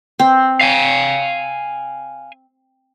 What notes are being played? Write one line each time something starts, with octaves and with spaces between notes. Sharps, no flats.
C4
F5 G#5